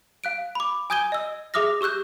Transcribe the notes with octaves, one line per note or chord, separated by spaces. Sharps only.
F5 F#6 D7
B5 D6
G#5 D#6 G6 G#6 D#7 G7
D#5 E6
G#4 E5 D6 D#6 F6 A#6
G4 C#6 E6 F#6 G6